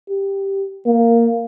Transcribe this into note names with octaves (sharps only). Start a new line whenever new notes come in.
G4
A#3